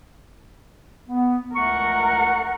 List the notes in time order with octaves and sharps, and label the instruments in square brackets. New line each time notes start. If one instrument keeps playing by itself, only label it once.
[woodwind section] B3
[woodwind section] C#2 A3 C#6 [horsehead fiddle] A#4 F#5